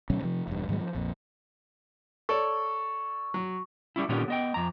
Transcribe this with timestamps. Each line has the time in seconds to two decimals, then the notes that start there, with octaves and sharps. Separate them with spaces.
0.10 D2 B2 F#3 C#4
0.22 C3 F3
0.48 E1 G2
0.69 G#2 D#3 F#3 G#3
0.81 F3
0.95 A#1 F2 A#2
2.29 A4 C#5 D5 C#6
3.34 F#3
3.96 G3 C#4 E4
4.09 A#2 D3 D#3 G3 B3 C#4
4.28 B3 D#5 G5
4.54 F2 A#5